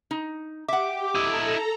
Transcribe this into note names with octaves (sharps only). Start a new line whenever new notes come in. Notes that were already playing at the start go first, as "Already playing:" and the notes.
D#4
G4 E5 F#5 D6
E4 A4 D#5 A#5